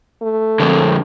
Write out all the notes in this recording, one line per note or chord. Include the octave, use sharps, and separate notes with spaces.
A3
F2 D3